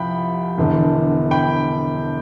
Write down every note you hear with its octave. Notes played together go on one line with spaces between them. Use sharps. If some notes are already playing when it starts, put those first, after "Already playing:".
Already playing: C2 C3 F3 F5 G5 B5
E1 E2 D3
G5 B5